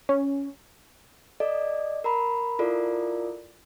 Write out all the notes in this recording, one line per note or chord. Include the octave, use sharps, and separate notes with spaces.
C#4
A4 D5 D#5
A#4 A#5 B5
E4 F4 A4 A#4 D5